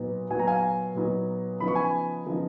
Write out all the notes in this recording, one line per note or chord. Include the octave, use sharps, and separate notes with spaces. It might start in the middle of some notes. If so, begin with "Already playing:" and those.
Already playing: A#2 F#3 B3 D#4
A#2 F#3 B3 D#4 G#5
A#5
F5 G#5
A#2 F#3 B3 D#4
C#3 F3 B3 D#4 B5
C#6
G#5 B5
C#3 F3 B3 D#4